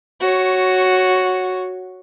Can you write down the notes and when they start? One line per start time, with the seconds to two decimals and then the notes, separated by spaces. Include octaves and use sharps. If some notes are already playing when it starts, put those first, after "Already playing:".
0.20 F#4 C#5